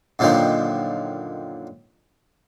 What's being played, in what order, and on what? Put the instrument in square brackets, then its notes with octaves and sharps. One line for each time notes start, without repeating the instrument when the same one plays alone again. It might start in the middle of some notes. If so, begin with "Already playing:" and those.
[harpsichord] F#2 A#2 D3 D#3 F3